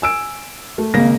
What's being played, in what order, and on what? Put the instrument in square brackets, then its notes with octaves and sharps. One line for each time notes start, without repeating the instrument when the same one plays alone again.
[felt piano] G#5 E6 D7
A3
[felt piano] G#1 A#6 [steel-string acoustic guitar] C#3 A#3